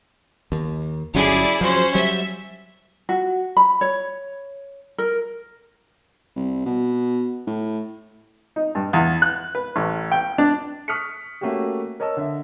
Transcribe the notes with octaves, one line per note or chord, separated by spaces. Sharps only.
D#2
G1 F#3 C#4 E4 G#4 D5
F3 F#3 C#4 C5
F#3 G3 E5
F#4
B5
C#5
A#4
C2
B2
A2
D#4
G2
E2
F#6
B4
A1
G5
D4
C#6 D#6 F6 F#6 B6 C#7
A3 A#3 C#4 F#4 G4
A#4 C#5 D#5 A5 E6
D3 E5